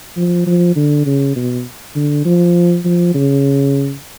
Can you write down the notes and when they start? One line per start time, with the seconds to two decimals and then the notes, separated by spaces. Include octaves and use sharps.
0.17 F3
0.46 F3
0.76 D3
1.06 C#3
1.36 B2
1.95 D3
2.25 F3
2.85 F3
3.14 C#3